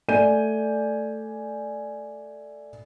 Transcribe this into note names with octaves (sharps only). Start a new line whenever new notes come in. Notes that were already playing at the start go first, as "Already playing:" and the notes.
A3 D5 G#5 G6 D#7